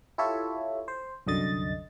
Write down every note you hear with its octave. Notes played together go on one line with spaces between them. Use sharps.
E4 F4 G4 A4 C#5 E5
C5
C2 F#2 D3 D#5 A6